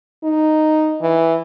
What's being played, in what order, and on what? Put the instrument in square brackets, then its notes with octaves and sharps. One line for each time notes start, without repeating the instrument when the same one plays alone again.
[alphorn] D#4
E3